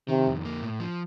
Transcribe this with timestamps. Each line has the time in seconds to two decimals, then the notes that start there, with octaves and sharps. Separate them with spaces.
0.09 C3 D#3
0.26 F2
0.45 A#3
0.62 A2
0.80 F3